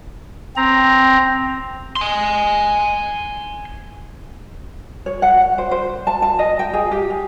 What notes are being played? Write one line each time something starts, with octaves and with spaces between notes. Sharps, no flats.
C4 A#5
G#5 C6
C#5
F#5
C5
C5
A5
A5
D#5
G5
G#4
G4
G#4